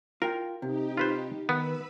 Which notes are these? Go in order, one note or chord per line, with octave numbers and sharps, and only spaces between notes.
F4 A#4 G5
C3 D#4 G4
F4 B4 C5
D#3 B3 B4 B5 E6